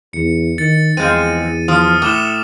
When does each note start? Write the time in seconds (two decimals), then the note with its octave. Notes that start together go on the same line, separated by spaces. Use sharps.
0.13 E2 C#7
0.58 D#3 A6 C#7
0.97 E2 F3 G#3 C4 D#7
1.68 F3 D#6 F6
2.02 A2 D6 E7 G7